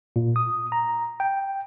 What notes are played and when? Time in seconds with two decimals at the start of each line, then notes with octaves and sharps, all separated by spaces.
0.16 A#2
0.36 D#6
0.72 A#5
1.20 G5